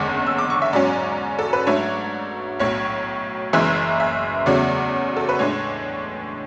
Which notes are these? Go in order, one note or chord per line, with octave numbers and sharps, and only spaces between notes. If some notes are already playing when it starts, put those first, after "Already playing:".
Already playing: F#1 E2 D3 G#3 C#4 D6
E6
D6
C#6
E5
G#2 F#3 C#4 D5
A4
B4
G#2 F#3 A3 D4 C#5
B1 A2 F#3 C#5
F#1 F#2 E3 G#3 E5
E5
E2 C#3 F#3 A3 D5
A4
B4
A2 G#3 D4 C#5